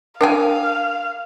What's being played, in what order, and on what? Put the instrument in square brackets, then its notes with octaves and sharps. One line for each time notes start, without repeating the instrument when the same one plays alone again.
[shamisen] D4 G5 G#5 [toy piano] A#4 [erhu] F5